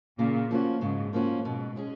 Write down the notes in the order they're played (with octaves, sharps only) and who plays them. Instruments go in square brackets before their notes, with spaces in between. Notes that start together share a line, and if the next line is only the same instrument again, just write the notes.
[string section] A#2 [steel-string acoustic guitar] C#3
[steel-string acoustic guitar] F3 A#3 C#4 F#4
[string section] G#2 [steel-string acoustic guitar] C#3
[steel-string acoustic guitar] F3 A#3 C#4 F#4
[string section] G#2 [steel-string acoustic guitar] B2
[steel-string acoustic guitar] G#3 C#4 G#4